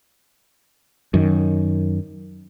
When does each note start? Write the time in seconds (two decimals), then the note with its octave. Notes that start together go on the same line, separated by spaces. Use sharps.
1.14 F#2 D#3